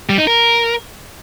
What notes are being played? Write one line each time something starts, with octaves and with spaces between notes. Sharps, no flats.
G3
D#4
A#4